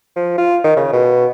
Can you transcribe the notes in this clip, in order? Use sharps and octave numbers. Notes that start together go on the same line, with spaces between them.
F3
F4
D#3
C#3
B2